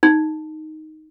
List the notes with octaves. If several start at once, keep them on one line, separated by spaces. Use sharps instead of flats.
D#4